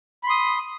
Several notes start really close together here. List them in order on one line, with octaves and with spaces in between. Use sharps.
B5 C6 D#6